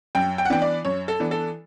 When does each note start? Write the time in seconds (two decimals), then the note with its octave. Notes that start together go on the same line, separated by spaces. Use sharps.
0.15 F#2 G5
0.38 G5
0.45 F#5
0.50 E3 B3 D4 G5
0.62 D5
0.85 F#2 C#5
1.08 A4
1.20 E3 B3 D4
1.31 A4